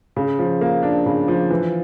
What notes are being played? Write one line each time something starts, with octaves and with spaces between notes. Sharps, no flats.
C#3
F3
A#3
D4
C#3
F3
E3